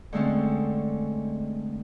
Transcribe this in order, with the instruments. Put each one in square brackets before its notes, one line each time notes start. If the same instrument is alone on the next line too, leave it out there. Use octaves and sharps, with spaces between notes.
[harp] D3 G#3 A3 C4 C#4